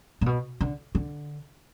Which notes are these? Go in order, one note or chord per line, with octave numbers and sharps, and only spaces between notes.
A#2
B2
D3
D3